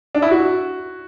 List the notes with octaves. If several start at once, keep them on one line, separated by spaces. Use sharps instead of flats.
D4
E4
F#4